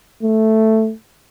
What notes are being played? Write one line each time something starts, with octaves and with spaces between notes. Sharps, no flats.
A3